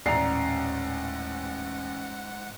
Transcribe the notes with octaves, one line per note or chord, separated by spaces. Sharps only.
D#1 A1 G#2 D5 F#5 G#5 A#5 C7